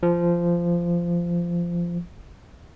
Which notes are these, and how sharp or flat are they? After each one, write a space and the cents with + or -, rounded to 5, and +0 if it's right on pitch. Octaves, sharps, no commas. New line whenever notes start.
F3 -15